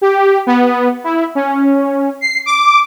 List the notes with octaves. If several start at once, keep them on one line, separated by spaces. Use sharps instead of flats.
G4
B3
E4
C#4
C7
D6